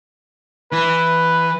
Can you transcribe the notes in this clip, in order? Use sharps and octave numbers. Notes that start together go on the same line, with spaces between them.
E3 E4 B4